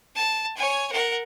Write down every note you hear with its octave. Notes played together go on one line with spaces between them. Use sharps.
A5
C#5 G#5
A#4 F#5